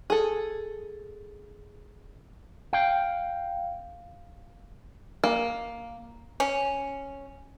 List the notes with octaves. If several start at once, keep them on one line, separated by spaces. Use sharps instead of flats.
G#4 A4
F5 G5
A#3
C#4